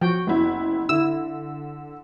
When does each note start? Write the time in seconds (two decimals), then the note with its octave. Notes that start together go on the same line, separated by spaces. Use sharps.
0.01 F3 F#4 G5
0.27 F#1 B3 E4
0.89 D3 E4 E6